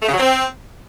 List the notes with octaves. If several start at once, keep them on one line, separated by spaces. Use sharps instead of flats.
A3
C#3
F#3
C4